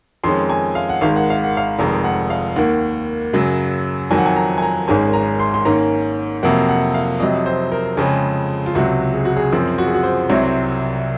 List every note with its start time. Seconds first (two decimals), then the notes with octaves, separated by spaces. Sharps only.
0.24 F2 D#3 G#3 C#4 C6
0.50 G#5
0.75 F5
0.89 F#5
1.01 G#1 G#2 D#3 G#3 F5
1.16 F#5
1.30 F5
1.44 F#5
1.57 F5
1.79 F1 F2 D#3 G#3 A#5
2.04 F#5
2.30 F5
2.56 D#2 D#3 A#3 F#5
3.33 F#2 C#3 F#3
4.11 F2 D#3 F#3 G#5
4.18 F#5
4.26 G#5
4.36 A#5
4.58 G#5
4.62 A#5
4.88 G#1 G#2 D#3 G#3 C#4 G#5
5.13 A#5
5.39 C6
5.54 C6
5.65 G#2 D#3 A#3 C#4 A#5
6.43 F2 C3 F#3 A#3 F#5
6.69 F#5
6.94 F5
7.20 F2 C3 F#3 D#5
7.46 C5
7.72 A#4
7.97 F2 C#3 G#3 C#4 G#4
8.66 F4
8.75 C#2 C3 F#3 F#4
9.14 G#4
9.25 F#4
9.37 G#4
9.52 F#2 F3 C4
9.78 F#4
9.86 G#4
9.94 F#4
10.03 C5
10.29 C2 C3 F#3 C4 C#5